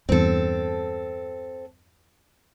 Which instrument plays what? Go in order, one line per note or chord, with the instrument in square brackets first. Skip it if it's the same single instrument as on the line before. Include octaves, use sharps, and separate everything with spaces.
[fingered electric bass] E2 G2 [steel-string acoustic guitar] C4 A4